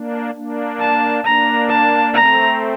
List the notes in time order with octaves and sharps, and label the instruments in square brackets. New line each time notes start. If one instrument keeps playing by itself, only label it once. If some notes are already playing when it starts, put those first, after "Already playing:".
Already playing: [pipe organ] A#3 D4
A#3 D4
[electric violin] A5
[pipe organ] A#3 D4 [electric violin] A#5
[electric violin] A5
[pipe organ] A3 C4 [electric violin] A#5